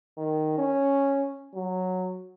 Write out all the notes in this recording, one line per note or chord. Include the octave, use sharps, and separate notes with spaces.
D#3
C#4
F#3